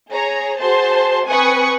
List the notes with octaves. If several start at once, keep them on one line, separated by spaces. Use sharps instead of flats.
G#4 C#5 A#5
F#4 G#4 C5 A5 C6
C4 B4 G#5 C#6 D#6 F#6